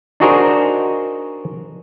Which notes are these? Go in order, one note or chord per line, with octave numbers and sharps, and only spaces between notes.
D4 D#4 F#4 G#4 A#4 C5